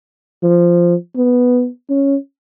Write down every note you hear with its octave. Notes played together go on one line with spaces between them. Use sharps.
F3
B3
C#4